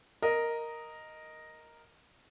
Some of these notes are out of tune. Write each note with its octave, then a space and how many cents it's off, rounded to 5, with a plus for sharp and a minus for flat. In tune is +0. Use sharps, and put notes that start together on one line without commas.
A#4 +0 D#5 +0